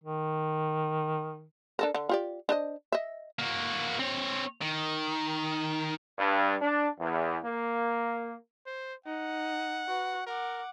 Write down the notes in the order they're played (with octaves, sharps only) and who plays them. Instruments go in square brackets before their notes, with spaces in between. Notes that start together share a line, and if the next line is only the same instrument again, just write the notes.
[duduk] D#3
[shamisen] D4 A4 A#4
D3
F4 G4 D5
D4 C5 D#5
D#5 E5
[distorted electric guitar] A#3 F#4
C4 C#5
D#3
[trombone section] G2
D4
E2
A#3
[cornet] C5
[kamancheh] D#4 [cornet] F#5
[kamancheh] F#4 B4
[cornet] A#4 [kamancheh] F#5 D6